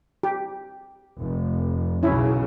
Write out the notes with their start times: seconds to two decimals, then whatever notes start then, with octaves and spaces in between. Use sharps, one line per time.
0.23 G4
1.18 F1
2.03 B1 C#3 F#3 C#4 E4